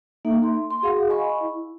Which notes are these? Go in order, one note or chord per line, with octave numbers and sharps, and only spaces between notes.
A#3 D#4 A4 E5
C6
C6
F#4 G#4 F5 F#5
D#5 F5 G#5 B5 C#6
E4